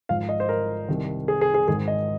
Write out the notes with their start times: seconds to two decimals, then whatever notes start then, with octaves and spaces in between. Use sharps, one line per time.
0.09 G#1 G#2 F3 F5
0.29 D#5
0.40 C5
0.49 A#4
0.88 C2 C3 D#3
1.28 G#4
1.41 G#4
1.54 G#4
1.68 G#1 G#2 D#3 G#4
1.88 D#5